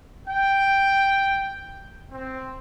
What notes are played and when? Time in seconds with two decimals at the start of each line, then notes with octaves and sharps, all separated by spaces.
0.28 G5
2.11 C4